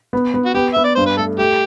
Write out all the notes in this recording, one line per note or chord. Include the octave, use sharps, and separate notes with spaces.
B3
B3
F#4
B3 G4
B3 E5
D5
G2 C5
B4
A3 A4
A3 G4